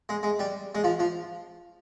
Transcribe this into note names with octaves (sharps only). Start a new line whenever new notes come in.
G#3
G#3
G3
G#3
F3
F3